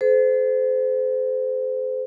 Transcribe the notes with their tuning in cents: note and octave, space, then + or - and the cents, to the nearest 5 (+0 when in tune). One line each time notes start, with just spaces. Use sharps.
A4 -45 C5 -30